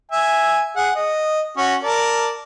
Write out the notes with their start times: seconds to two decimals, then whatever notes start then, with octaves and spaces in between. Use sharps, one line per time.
0.12 E5 G#5
0.76 G#4 F#5
0.95 D#5
1.57 C#4 F#4
1.83 A#4 D5 A5